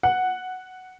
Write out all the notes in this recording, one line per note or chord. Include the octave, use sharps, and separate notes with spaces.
F#5